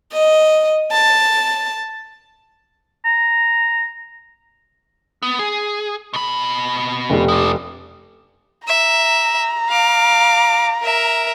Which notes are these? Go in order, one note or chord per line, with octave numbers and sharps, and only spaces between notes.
D#5
A5
A#5
B3
G#4
B2 B5
F1 G4
F3 D4
E5 A#5
F5 D6
A#4 E5